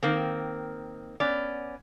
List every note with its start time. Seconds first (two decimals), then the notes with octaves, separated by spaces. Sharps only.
0.03 D#3 A#3 C4
1.20 B3 C#4 D5